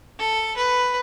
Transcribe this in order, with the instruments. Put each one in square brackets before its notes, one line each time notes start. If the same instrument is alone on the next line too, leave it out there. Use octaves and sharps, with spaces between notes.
[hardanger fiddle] A4
B4